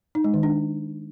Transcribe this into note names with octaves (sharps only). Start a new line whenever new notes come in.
D#4
G#3
D#3
D4